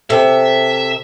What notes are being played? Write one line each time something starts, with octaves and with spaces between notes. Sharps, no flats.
C3 A4 E5